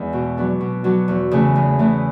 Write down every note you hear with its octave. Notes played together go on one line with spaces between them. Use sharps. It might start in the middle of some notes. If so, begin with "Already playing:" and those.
Already playing: E2 G#3
B2
F#3 B3 D4
B2
F#3 B3 D4
E2
C#3 E3 A3
E2
C#3 E3 A3